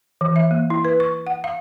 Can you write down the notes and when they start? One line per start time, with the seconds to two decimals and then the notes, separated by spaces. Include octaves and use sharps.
0.21 E3
0.36 E5
0.51 A#3
0.70 E4
0.85 B4
1.00 C#6
1.27 F#5
1.44 F5